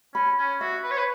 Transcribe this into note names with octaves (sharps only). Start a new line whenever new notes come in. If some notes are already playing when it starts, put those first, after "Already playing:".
C#4 B5
C#4
F#4 E5
B4
C#5
B4